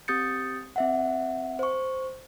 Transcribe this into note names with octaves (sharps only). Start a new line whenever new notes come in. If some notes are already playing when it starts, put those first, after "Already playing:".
C4 G4 D#6 G6 A6 C#7
C4 E5 F#5
C5 C#6